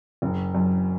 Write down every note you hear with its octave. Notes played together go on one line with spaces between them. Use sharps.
F#1
F#2